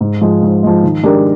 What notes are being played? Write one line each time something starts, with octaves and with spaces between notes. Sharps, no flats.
G#2
F3 G#3
G#2
F3 G#3
D#3
G#3 D4 G4 A#4